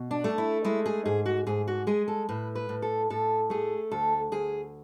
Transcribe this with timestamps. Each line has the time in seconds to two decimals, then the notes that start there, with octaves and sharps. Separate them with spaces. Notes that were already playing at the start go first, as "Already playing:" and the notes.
Already playing: B2
0.11 D4
0.24 A3
0.38 E4
0.65 G#3 E4
0.86 G#4
1.05 G#2 G#4
1.26 F#4
1.47 G#2 G#4
1.68 F#4
1.87 G#3 G#4
2.08 A4
2.29 A2 B4
2.55 B4
2.69 A2
2.82 A4
3.10 A2 A4
3.50 A3 G#4
3.91 D2 A4
4.32 D2 G#4